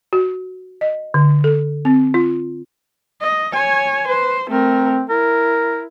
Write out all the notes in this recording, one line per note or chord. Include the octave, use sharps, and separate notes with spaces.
F#4
D#5
D3
A4
C4
F4
D#5
C#5 G#5
B4 C5
A3 C4 A#4
E4 A#4